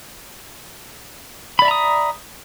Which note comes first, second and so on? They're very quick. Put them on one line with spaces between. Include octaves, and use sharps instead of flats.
B5 D5 E5 A#5 D#6